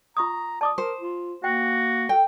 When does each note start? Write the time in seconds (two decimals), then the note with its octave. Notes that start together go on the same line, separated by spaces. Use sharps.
0.17 F4 A#5 C#6 D#6
0.61 D5 A5 D6 D#6
0.78 A#4 C5
1.01 F4
1.44 A#3 F#4 G5
2.09 A4 G5